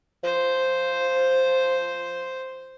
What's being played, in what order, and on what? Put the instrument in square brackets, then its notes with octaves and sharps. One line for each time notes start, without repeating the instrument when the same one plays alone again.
[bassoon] F3 [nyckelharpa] C5